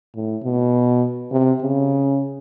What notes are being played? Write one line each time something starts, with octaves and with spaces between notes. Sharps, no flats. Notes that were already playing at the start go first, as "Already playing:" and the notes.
A2
B2
C3
C#3